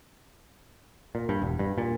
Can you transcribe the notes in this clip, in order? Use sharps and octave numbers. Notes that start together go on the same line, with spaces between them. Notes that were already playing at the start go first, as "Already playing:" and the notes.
A#2
G2
E1
G2
A#2